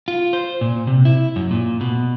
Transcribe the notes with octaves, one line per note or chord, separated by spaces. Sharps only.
F4
C5
A#2
C3
E4
F#2
A#2
B2